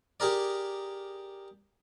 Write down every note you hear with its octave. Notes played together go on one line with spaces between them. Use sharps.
G4 G#4 A#4 D5